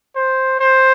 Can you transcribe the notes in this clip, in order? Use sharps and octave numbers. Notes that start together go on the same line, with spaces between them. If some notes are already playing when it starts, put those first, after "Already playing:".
C5
C5